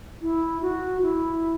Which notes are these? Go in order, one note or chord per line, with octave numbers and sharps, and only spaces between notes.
E4
F#4
E4